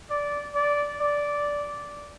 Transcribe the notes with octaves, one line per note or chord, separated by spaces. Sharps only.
D5
D5
D5